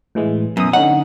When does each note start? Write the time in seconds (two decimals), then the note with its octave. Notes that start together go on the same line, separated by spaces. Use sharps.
0.15 A2 E3 G#3
0.57 F#2 B2 D#6
0.73 D3 C#4 D#4 F#5